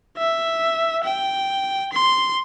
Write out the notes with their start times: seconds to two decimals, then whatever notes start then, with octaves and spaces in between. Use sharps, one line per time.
0.17 E5
1.05 G5
1.93 C6